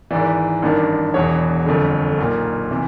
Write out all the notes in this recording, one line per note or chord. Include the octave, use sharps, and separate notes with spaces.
G#1 G#2 E3 D5
A1 G2 D#3
E1 E2 B2 C#5
G1 F2 D3
B1 A#2
C3 E3